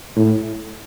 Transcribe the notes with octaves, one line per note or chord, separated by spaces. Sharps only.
A2